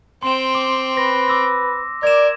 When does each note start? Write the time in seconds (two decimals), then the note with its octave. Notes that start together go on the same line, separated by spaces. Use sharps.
0.23 C4 G5 C6 E7
0.55 D6
0.97 B4 A#6
1.28 D6 E6 A#6
2.03 A#4 D5 G#6 E7